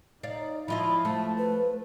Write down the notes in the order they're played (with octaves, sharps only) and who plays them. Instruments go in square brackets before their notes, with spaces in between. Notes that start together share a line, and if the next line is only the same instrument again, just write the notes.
[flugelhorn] D#4 [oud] D5 F5
[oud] F3 F4 D#5 [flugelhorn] E4 [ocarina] B5
[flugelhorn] F3 [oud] A3 [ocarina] A5
[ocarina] B4